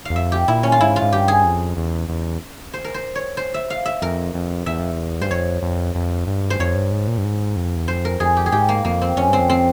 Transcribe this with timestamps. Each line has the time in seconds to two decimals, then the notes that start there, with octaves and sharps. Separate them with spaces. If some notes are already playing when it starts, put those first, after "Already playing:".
0.05 E2 F5
0.15 F2 E5
0.32 G4
0.48 A#2 E4
0.63 C#4
0.72 F4
0.80 G#2 E4
0.96 F4
1.02 G#2
1.12 G2 G4
1.28 G#4
1.44 F2
1.77 E2
2.09 E2
2.74 C5
2.84 A#4
2.94 C5
3.15 C#5
3.37 C5
3.54 E5
3.70 F5
3.86 E5
4.02 F2 A#4
4.34 F2
4.66 E2 E5
4.79 F2
4.91 E2
5.21 G2 C5
5.31 F2 C#5
5.62 F2
5.95 F2
6.27 G2
6.50 C5
6.60 F2 C#5
6.75 G2
6.91 G#2
7.08 A#2
7.18 G2
7.24 G#2
7.56 F2
7.76 E2
7.88 F2 C5
8.05 A#4
8.20 F2 G#4
8.37 G4
8.46 G#4
8.52 G#2 G4
8.69 A#3
8.85 F2 A#3
9.01 C4
9.17 F2 C#4
9.28 G2 C4
9.39 F2
9.49 C4